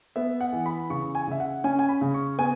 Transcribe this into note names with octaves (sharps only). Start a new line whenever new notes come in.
B3 E5
F#5
E3
B5
C#3 C#6
G#5
C#3 E5
F#5
C#4 G#5
G#5
B5
C#3
C#6
B3 G#5